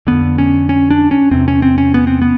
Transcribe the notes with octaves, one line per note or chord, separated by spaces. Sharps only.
F2 D3 B3
C#4
C#4
D4
C#4
E2 C3 C4
C#4
C4
C#4
B3
C4
B3